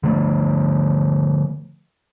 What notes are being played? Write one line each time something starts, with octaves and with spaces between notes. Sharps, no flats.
D3 F3 A3